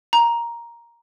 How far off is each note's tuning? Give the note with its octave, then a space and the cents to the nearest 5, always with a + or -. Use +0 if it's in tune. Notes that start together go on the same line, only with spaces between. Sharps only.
A#5 +5